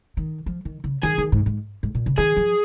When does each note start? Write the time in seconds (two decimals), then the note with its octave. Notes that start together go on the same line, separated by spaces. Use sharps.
0.17 D#3
0.46 F3
0.65 D#3
0.84 C#3
1.03 D#3 G#4
1.18 D#3
1.32 G#2
1.46 G#2
1.83 G#2
1.95 A#2
2.06 C#3
2.18 D#3 G#4
2.36 F3